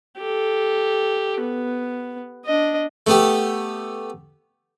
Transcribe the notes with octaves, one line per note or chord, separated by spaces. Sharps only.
G4 A4
B3
D4 D#5
A3 B3 G4